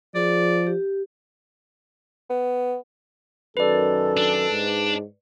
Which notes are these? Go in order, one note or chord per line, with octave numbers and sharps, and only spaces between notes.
F3 G#4 D5
G4
B3
F#2 D#3 A4 B4 D5
D4
G#2